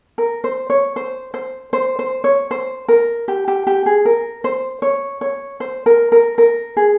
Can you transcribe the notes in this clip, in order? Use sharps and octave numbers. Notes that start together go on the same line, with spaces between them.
A#4
C5
C#5
C5
C5
C5
C5
C#5
C5
A#4
G4
G4
G4
G#4
A#4
C5
C#5
C#5
C5
A#4
A#4
A#4
G#4